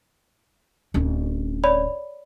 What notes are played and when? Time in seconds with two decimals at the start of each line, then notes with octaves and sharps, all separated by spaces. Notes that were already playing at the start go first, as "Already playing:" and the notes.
0.94 D1 C#4
1.64 C#5 D5 B5